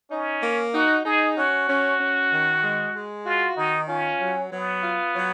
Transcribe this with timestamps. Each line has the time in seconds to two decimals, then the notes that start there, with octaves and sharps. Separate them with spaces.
0.11 C#4 D#4
0.43 A#3
0.74 D#4 F#4
1.05 D#4 G#4
1.37 C#4 F#4
1.68 C#4
2.00 C#4
2.31 D#3
2.63 G#3
2.94 G#3
3.26 F4 F#4
3.57 D#3 D#4
3.88 C#4 F4
4.20 F#3
4.52 F#3 B3
4.83 F4
5.15 F#3